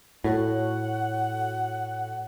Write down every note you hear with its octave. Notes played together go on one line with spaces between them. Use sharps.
A2 F#4 A4 C#5 F#5